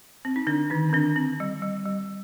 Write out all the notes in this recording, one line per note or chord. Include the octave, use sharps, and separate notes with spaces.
C4
D#4
D3 D4
D#3 D#4
C4
D3 D4
C4
G3
G3
G3